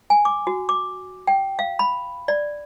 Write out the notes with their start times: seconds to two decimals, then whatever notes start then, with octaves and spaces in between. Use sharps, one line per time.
0.10 G#5
0.25 D6
0.47 F#4
0.69 D6
1.27 G5
1.59 F5
1.79 B5
2.28 D5